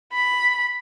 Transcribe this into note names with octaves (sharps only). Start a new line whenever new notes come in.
B5